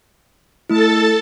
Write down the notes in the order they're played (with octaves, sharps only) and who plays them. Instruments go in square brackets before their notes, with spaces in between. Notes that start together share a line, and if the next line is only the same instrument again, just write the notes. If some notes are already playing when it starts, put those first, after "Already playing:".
[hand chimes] A3 E4 [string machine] A4 A5